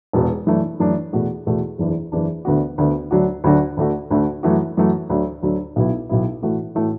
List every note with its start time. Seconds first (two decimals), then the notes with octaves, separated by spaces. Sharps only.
0.13 E1 E2 B2 B3
0.47 F#2 E3 A3 D4
0.80 F#2 E3 A3 D4
1.13 E2 B2 A3 F#4
1.46 E2 B2 A3 F#4
1.78 F#1 E2 E3 D4
2.12 F#1 E2 E3 D4
2.45 D2 D3 B3 F#4
2.78 D2 D3 B3 F#4
3.11 D2 D3 F#3 D4 F#4
3.44 D2 D3 F#3 D4 F#4
3.77 D2 D3 A3 F#4
4.10 D2 D3 A3 F#4
4.43 F#2 E3 A3 F#4
4.77 F#2 E3 A3 F#4
5.10 D2 D3 F#3
5.43 D2 D3 F#3
5.76 B1 B2 B3 E4
6.09 B1 B2 B3 E4
6.42 A2 E3 A3 F#4
6.75 A2 E3 A3 F#4